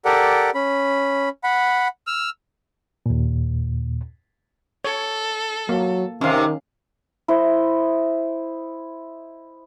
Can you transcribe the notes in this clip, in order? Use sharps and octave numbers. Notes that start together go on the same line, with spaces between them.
G4 A4 A#4 D5 F#5
C#4 B5
F#5 B5
E6 F6
D#2 A#2
A4 C#5
F#3 A#3
D#2 C3 D#3 C#4 F5
E4 C5 D#5